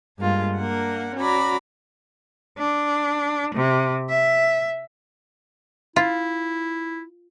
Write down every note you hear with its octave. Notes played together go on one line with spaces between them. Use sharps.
G2 G#3 A#3 F4
A#3 D4 A#4 F#5
C#4 F#4 D5 A#5 B5
D4
C3
E5
E4 F4